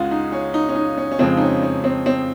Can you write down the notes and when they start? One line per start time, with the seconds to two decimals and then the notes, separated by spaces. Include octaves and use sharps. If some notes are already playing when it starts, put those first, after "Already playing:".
Already playing: C#2 C#3 G#3 F4 F#4 G#4
0.11 D#4
0.32 C#4
0.54 D#4
0.69 C#4
0.76 D#4
0.98 C#4
1.12 C#4
1.19 F2 C#3 F3 G#3 C4
1.37 D#4
1.41 C#4
1.63 C#4
1.84 C4
2.06 C4